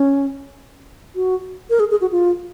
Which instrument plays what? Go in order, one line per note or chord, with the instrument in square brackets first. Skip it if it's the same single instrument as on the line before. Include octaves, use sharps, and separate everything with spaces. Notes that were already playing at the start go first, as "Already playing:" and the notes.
Already playing: [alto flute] C#4
F#4
A#4
G#4
G#4
F#4
F4